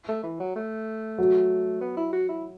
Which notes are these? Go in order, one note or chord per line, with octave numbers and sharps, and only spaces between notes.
A3
E3
F#3
A3
F#3
B3
E4
F#4
E4